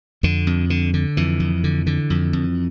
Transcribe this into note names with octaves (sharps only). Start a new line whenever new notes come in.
F2 D3
F2
D3
D3
F2 E3
F2
D3
D3
F2
F2